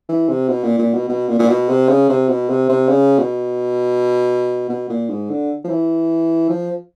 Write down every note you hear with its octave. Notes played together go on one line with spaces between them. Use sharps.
E3
C3
B2
A#2
A#2
B2
B2
A#2
A#2
B2
C3
C#3
C3
B2
C3
C3
C#3
B2
B2
A#2
G#2
D3
F3
E3
F3